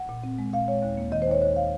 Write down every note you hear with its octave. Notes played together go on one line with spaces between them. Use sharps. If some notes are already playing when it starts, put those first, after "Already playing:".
Already playing: F#5
A#2
C4
G#3
A#2 F5
G#3 C#5
D#2
A#3
D#3 D#5
C5
D#2 C#5
D#2 C#5
F5